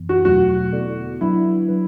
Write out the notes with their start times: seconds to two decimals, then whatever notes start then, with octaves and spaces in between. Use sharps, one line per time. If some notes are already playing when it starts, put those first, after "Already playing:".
Already playing: F#2 E3 B3
0.09 F#4
0.25 E2 B2 F#3 A3 F#4
0.73 D3 B3 E4 A4 D5
1.21 F#3 D4 E4 B4 E5
1.68 F#3 D4 B4